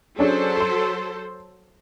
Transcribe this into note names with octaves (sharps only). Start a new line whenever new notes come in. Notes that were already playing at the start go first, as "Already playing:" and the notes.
F#3 C#4 D4 G#4 A4 C5
C6